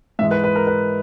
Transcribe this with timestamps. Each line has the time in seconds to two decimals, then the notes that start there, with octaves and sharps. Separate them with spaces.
0.19 G#2 E3 G#3 E5
0.31 B4
0.44 B4
0.56 A#4
0.67 B4